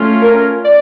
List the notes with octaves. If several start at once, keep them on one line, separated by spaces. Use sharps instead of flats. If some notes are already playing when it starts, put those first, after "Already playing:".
Already playing: A3 C#4 F4
A#4
D5